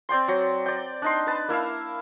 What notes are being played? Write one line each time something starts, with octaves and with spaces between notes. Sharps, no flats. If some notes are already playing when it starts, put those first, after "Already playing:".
C4 D5 G5 C6
F#3
D5 G5
D4 D#4 C6
B4 A5
A#3 E4 E5 F5